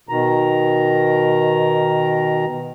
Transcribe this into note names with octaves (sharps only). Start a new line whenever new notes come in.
B2 D#3 A#5